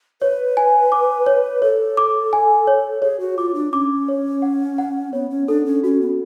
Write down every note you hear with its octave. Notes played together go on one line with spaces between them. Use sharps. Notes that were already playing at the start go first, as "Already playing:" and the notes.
B4 C#5
G#5
D6
C#5
A4 C#5
D6
G#5
C#5
G#4 C#5
F#4
F4 D6
D4
C#4 D6
C#5
F#5
F#5
B3 C#5
C#4
D4 A4
C#4
C#4 F#4
B3